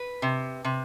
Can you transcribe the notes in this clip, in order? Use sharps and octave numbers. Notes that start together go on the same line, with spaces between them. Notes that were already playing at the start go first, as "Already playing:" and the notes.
Already playing: B4
C3
C3